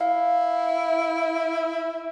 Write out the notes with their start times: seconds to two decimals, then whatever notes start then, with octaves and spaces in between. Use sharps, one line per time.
0.01 E4 F5